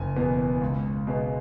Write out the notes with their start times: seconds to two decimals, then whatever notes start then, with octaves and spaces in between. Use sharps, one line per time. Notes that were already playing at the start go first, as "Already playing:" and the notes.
Already playing: F#1 G#5
0.16 E2 B2 B3
0.61 C#2
1.07 B2 G#3 B3